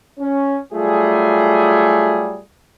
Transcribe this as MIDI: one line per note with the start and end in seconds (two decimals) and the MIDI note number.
0.19 0.58 61
0.72 2.40 54
0.72 2.40 55
0.72 2.40 57
0.72 2.40 65
0.72 2.40 68